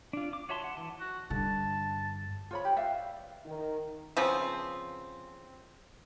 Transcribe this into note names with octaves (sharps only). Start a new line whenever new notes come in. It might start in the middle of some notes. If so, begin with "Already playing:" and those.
D4 F4
D6
F#4 C#5 E5 A5 C6
F#5
E3 A5
F#4
G2 D3 A5
F4 C#5 B5
G4
B4 D5 E5 F5
D#3
C#3 F3 B3 C4